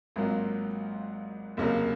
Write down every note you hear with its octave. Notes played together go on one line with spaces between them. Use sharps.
G#1 G#2 F#3 A#3 F4
F1 D#2 C#3 F#3 A#3